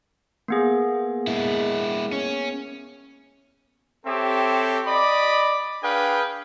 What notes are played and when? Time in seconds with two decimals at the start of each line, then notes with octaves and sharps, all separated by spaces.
0.48 A#3 B3 G#4
1.27 G#3 E4
2.12 C#4
4.06 C4 G4 A4 C#5 E5
4.87 D5 D#5 B5 D6
5.83 D4 G#4 B4 F5 G5